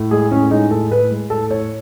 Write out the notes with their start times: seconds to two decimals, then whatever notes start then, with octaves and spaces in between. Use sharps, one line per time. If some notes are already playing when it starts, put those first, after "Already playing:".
Already playing: A2
0.11 G#3 G#4
0.31 A2 C#4
0.51 G#3 D#4
0.71 A2 A4
0.90 A2 B4
1.10 G#3
1.30 A2 A4
1.50 A2 C#5